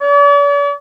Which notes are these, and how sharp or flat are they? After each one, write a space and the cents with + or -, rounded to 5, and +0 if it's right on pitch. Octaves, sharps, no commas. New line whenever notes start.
D5 -45